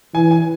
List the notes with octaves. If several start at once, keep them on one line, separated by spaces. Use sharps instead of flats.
E3 G#5
G#5